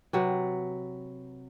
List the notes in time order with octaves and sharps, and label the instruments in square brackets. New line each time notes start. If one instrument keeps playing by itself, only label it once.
[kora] C3 F#3 B4